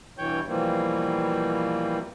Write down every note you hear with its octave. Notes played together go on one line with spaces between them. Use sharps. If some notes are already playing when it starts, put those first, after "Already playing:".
G2 B2 E3 C#5 G5 G6
B2 E3 F3 G3 A#3 C4